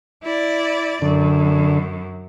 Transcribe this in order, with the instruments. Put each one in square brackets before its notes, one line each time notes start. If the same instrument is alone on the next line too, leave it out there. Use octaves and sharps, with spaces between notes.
[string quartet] E4 D5
[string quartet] F#2 [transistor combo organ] D3